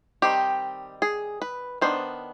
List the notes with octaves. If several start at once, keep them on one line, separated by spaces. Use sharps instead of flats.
D#3 G3 C4 D#4 G4
G#4
B4
D#3 B3 D4 C5